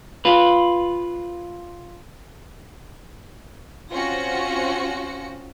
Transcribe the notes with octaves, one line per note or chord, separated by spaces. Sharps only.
F4 B4
C4 C#4 F4 F#4 A#6 C#7